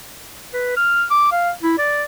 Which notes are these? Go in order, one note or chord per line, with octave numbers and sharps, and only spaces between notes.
B4
F6
D6
F5
E4
D5